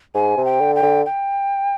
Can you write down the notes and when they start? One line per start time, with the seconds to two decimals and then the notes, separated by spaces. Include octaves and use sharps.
0.15 G#2 G#5
0.37 C3
0.45 G5
0.61 D3
0.76 G5
0.83 D3
1.06 G5